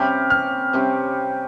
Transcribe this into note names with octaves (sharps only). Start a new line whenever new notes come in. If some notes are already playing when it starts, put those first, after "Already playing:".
Already playing: C3 G3 C#4 G4 F6
F6
C3 G3 C#4 G4